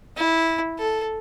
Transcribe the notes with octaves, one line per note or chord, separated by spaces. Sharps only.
E4
A4